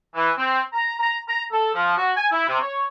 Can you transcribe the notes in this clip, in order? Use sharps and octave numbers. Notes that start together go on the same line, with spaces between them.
E3
C4
A#5
A#5
A#5
A4
F3
F#4
G#5
E4
C3
C#5